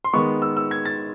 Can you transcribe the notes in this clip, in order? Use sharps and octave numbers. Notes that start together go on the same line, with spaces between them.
C6
D#3 G#3 B3 C#6
E6
E6
G#6
A6